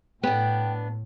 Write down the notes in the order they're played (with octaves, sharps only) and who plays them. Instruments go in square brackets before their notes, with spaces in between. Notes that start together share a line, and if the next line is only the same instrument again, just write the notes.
[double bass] A2 [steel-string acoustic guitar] B3 D4 [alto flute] G5